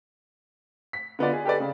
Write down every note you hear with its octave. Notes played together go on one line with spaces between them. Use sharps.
B6
D3 B3 F4 D5
G#4
G4 A4 B4 D5
C#3